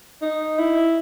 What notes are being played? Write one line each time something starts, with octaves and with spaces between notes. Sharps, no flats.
D#4
E4